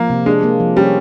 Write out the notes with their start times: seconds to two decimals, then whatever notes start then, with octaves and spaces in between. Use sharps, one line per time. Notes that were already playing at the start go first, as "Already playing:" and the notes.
Already playing: F3 A#3
0.10 C3
0.26 G#3 D4
0.43 A#3
0.60 F3
0.76 G3 C#4